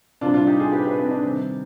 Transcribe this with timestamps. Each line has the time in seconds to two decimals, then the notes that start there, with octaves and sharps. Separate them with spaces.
0.21 C3 D4 F4
0.26 G3
0.34 D4 F4
0.47 D#4 G4
0.60 F4 G#4
0.73 G4 B4
0.85 G4 B4
0.98 C4 D#4
1.11 D4
1.23 C3 D#3 G3 C4